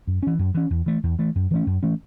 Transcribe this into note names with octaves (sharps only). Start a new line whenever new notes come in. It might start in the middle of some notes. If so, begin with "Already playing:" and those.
F#2
E3 C#4
F#2
E3 C#4
E2
E3 A3
E2
E3 A3
F#2
E3 A3 C#4
F#2
E3 A3 C#4